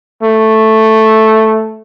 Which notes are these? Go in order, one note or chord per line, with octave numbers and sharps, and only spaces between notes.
A3